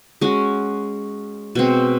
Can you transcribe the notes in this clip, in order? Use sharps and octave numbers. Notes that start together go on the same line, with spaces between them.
G#3 C#4 F#4
B2 G#3 C4